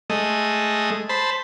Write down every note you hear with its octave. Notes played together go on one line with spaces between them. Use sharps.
G#3 A3 D#5
C5 A5 B5